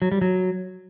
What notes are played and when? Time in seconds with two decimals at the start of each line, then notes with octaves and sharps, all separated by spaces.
0.02 F#3
0.12 G3
0.22 F#3